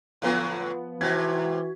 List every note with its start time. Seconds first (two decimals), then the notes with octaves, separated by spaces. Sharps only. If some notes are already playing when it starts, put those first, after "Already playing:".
0.22 A2 D3 F3 F#3 B3
1.01 G#2 C3 E3 F#4 G#6 B6